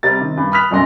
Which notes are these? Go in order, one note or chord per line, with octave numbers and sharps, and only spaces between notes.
C3 G3 G4 A#4 A6
C3 D#3
G2
B5 D#6 F6 F#6 B6 F7
F#1 B1 F#2 A#4 C6 A#6